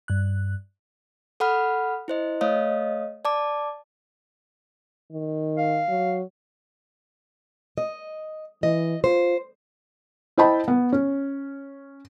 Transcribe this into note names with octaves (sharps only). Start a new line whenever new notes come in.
G2 F#6
A4 F#5 B5 F6
E4 C5 D#5
A3 C#5 D#5 F5 D#6
D5 A5 D6
D#3
F5
F#3
D#5
E3 D#5
F4 C5
E4 C5 D#5 G5 A5 B5
B3
C#4